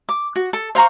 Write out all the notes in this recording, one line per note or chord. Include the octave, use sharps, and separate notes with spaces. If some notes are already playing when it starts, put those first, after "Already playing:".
D6
F#4
A4
C5 F5 A#5 C#6